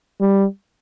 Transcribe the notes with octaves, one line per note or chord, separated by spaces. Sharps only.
G3